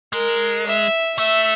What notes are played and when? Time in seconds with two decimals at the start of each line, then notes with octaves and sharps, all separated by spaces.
0.13 G#3 A#4
0.66 E5
1.19 A3 E5